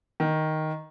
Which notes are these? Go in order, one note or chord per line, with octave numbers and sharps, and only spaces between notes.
D#3